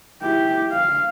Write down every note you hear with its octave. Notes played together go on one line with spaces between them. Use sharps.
E4 G4
F5